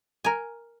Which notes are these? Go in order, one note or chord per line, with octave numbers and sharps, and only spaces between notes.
A#4 G#5